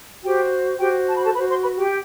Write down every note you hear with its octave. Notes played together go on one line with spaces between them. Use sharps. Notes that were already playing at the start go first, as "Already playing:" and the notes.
F#4 G4 C5 G5
F#4 G4 C5 G5
A5
B5
A4 A5
B4 C5 B5
F#4
C5 C6
B4 B5
G4 G5